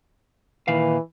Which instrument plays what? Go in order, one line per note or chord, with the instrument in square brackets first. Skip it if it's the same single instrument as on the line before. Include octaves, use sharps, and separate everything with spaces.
[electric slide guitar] A#2 D#3 F5 [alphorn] E3